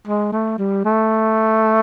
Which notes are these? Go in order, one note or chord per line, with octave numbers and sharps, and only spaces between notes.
G#3
A3
G3
A3